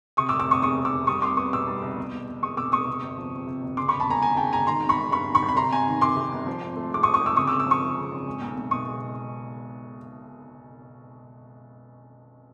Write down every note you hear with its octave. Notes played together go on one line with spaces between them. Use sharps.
C3 C#6 D#6
D6 E6
F1
D6 E6
F1 C#6 D#6
E2 C#6 D#6
C3
D6 E6
F1
G3 C#6 D#6
C2 C6 D6
B3 C#6 D#6
B2 D6 E6
G3
C2
B2
E1
E1
E2 C#6 D#6
B2 D6 E6
E1 C#6 D#6
C3
G1
F3
F2
C3
G1
C#3 C6 D6
B5 C#6
E1
A5 B5
E1 G#5 A#5
D#2 G#5 A#5
C#3 G5 A5
E1 G#5 A#5
D#3 A#5 C6
G#1
B5 C#6
G#1
G2 B5 C#6
D#3
B5 C#6
G#1
B5
C3 A#5 C6
G1 G#5 A#5
D#3
F2 C6 D6
C3
G1
F3
G#1
A3
G#2 D6
C#6 D#6
F3
C#6 D#6
G#1 D6 E6
C#3 C#6 D#6
D6 E6
G#1
D6 E6
F3 C#6 D#6
F#2
C#3
G#1
G#3
B1
B1
B2 C#6 D#6
G#3